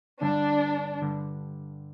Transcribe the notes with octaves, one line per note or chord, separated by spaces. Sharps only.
G2 D3 G3 D4
G2 D3 G3